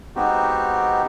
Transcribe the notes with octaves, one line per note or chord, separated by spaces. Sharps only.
G#3 B3 C4 D#4 F#4 G4